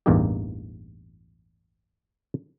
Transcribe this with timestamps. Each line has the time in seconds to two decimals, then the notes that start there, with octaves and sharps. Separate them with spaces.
0.06 A1 E2 G2 A#3 D#4 G4